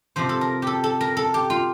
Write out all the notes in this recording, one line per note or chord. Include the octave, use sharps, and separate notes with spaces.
C3 F3 C5
A4
A#4
G4 A4
A4
A#4
A4
G4
F4